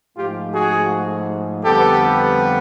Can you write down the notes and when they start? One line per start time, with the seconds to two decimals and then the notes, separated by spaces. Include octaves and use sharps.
0.17 G#2 F3 A3 F4 G4
0.53 F#4 G#4
1.63 F2 D3 G3 B3 G4 A4